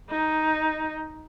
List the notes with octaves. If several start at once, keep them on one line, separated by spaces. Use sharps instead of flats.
D#4